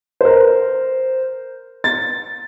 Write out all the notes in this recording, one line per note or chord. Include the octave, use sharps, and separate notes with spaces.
A#4 C5
A6